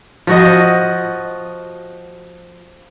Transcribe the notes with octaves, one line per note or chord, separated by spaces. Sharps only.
F3 F#4 D#5